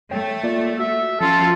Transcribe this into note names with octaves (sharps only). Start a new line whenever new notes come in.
A3 C#5 G5
A#3 F4 D5
F#4 E5
F3 C#4 F4 A4